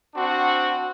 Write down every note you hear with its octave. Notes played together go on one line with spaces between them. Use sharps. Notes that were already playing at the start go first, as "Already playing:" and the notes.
C4 D4 F#4